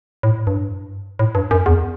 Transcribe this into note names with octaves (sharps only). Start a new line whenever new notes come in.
A2
G2
A2
G2
F#2
E2